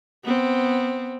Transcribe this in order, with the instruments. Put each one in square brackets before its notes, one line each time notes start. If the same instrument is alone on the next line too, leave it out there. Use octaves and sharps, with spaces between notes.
[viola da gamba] B3 C4